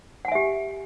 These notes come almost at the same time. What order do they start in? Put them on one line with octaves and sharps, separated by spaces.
F#5 G#5 E5 G4